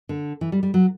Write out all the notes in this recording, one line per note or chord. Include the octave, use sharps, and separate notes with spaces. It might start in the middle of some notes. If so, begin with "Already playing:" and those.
D3
E3
G3
G3
F#3